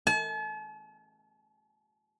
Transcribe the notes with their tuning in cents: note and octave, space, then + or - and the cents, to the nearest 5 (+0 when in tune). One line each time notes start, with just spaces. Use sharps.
A5 -45